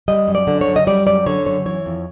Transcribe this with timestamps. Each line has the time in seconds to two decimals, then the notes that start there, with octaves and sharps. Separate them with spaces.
0.08 G3 D#5
0.28 F#2
0.35 D5
0.47 D3
0.61 C#5
0.68 F#2
0.76 D#5
0.87 G3 D5
1.06 F#2 D5
1.26 D3 C#5
1.46 F#2 C#5
1.66 E3 C#5
1.86 F2